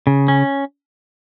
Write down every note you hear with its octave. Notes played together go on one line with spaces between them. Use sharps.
C#3
C#4